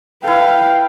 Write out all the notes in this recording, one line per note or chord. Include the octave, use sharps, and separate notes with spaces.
E4 A4 B4 F5 G5